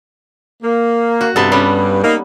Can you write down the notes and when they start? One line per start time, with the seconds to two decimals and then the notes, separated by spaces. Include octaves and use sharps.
0.63 A#3
1.21 F#4
1.36 G2 C3 B3 A4
1.52 G3 B3 C#4
2.04 A#3 D#4